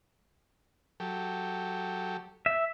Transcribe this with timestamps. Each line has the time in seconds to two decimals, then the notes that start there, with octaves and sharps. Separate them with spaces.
1.00 F#3 G4 A4
2.46 E5